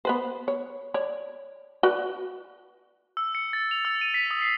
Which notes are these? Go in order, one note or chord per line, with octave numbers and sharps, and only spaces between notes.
B3 B4 C5
C#5
C#5 D5
F#4 B4 D5
E6
C#7
A6
F7
E6
D#7
B6
D#6
C7